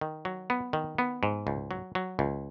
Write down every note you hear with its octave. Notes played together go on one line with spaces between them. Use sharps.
D#3
F#3
B3
D#3
B3
G#2
C#2
F#3
F#3
C#2